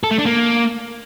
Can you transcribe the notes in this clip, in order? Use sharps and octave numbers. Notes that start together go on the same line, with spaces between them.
A4
A3
D4
A#3